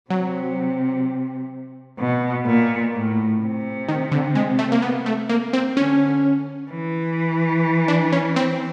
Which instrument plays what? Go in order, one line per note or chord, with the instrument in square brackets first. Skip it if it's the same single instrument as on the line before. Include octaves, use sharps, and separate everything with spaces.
[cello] C3 [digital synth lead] F#3
[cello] B2
A#2
A2
C3
[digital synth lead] D#3
D3
G#3
A3
A#3
B3
A3
A#3
C4
[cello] D3 [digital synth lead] C#4
[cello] E3
[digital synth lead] D4
C#4
C4